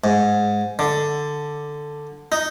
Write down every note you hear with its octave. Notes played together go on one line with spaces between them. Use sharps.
G#2
D3
D#4